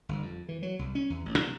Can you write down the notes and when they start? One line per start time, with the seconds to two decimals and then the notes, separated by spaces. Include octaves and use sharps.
0.09 G1
0.22 F2
0.49 E3
0.63 F#3
0.79 C2
0.95 C#4
1.10 E2
1.26 A1
1.38 C3